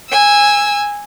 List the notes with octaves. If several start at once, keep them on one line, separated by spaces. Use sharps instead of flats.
G#5 E6